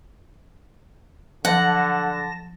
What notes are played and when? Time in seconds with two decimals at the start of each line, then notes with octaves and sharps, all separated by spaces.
1.45 D3 F3 F#3 F#5 A5 A#6